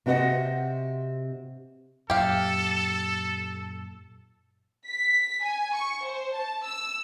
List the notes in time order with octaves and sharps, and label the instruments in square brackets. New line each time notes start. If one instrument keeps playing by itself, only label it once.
[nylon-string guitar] C3 C4 F#4 C5 D#5 F#5
[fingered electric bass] F#2 A#2 [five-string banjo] G4 F5 [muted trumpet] A4
[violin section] B6
G#5
C#6
C5
A5
E6